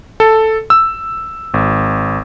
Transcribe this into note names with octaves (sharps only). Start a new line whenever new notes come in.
A4
E6
G#1